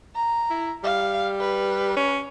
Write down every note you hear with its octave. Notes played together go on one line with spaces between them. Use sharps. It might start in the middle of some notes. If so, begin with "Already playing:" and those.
A#5
E4
G3 F5
B4
C#4